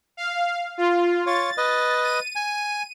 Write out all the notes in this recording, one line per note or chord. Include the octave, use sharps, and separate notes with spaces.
F5
F4
F4 C#5 A6
B4 D#5
D#7
G#5